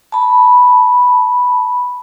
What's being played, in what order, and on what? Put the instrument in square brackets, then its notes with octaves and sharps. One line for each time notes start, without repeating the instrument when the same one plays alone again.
[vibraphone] A5 B5